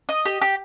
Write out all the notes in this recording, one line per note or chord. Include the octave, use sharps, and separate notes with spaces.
D#5
G4
G4